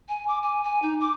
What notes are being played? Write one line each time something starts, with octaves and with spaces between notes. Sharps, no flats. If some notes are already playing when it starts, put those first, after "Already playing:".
G#5
D6
G#5
G#5
D#4
D6